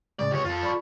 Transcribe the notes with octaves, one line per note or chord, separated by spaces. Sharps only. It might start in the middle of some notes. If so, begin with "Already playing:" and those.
A2 C#3 G#3 D5
C#2 G4 C#5 D#5
F2 F4 A4
D5 B5 C#6